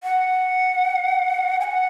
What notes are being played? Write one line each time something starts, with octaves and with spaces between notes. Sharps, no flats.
F#5
G#5
F#5